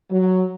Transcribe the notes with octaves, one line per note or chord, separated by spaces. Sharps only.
F#3